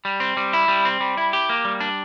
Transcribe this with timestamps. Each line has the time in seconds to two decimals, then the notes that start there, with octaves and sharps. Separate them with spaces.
0.05 G3
0.20 C4
0.37 G3
0.53 E4
0.68 G3
0.85 C4
1.01 G3
1.17 E4
1.33 G4
1.49 A#3
1.65 G3
1.80 D4